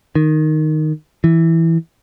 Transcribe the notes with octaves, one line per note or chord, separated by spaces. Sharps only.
D#3
E3